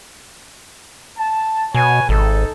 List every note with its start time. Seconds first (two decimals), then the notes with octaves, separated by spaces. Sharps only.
1.18 A5
1.74 B2 B4 C#5 G#5
2.09 G#1 D#4 A4